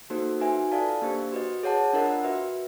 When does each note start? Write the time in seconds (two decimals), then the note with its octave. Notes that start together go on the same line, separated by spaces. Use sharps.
0.10 A#3 D#4 F#4 A4 C5
0.40 D#4 F#4 B4 E5 G#5
0.72 F4 A4 D5 F5 A5
1.02 A#3 D4 G4 C5
1.32 F#4 B4 D#5
1.63 G#4 C#5 F#5 A5
1.93 D4 F4 A#4 D#5 F#5
2.24 F#4 B4 E5